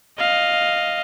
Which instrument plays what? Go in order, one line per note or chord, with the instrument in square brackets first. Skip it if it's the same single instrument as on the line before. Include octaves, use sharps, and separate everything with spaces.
[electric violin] D#5 F5